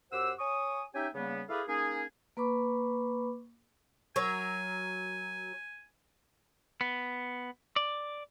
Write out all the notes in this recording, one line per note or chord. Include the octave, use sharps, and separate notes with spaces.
F#2 G4 C5 F#5 E6
C#5 G#5 C#6 D#6
C#4 D#4 G4 E5 G5 G#5
C#3 G3 A#3 B3
E4 G#4 A4 B4 D5 F5
A#3 C#4 D#4 G#4
A#3 B4 B5 C#6 D6
F#3 A#4 C#5 G#5
B3
D5